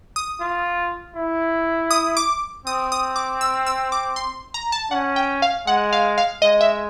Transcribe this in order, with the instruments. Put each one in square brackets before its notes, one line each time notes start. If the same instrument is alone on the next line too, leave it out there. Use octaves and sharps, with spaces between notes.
[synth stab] D#6
[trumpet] F4
E4
[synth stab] D#6
D6
[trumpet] C4 [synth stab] D#6
[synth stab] D#6
D6
E6
E6
D6
C6
A#5
A5
[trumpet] C#4 [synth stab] F#5
[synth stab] G5
F5
[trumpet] G#3 [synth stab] F#5
[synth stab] F5
F5
[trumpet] G#3 [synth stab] D#5
[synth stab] E5